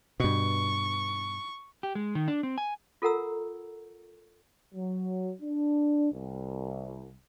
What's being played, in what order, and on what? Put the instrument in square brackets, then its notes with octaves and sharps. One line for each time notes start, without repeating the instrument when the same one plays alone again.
[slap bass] G2 B2 [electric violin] C#6
[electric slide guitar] G4
G#3
D#3
D4
C4
G#5
[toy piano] F4 A4 A#4 F#5 A#5 E6
[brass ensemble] F#3
D4
C2